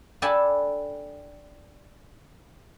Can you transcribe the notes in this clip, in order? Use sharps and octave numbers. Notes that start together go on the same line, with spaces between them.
D4 G4 A4 G#5 B5